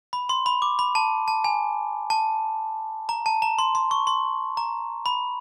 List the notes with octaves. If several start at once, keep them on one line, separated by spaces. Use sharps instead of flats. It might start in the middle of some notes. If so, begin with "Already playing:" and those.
B5
C6
B5
D6
B5
A5
A5
G#5
A5
A#5
A5
A#5
C6
C6
C#6
C6
A#5
B5